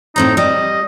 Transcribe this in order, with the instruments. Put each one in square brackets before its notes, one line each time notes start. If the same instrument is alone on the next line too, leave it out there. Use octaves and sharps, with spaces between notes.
[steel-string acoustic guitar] A2 C4 A#5 [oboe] D#4
[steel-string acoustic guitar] G3 [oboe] D#5